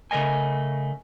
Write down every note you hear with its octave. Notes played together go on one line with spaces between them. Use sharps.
C#3 A3 A#4 D#5 G#5